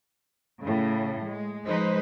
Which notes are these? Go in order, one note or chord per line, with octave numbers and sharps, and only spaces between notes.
A2 C#3
G#3
F3 G#3 D#4 B4 C5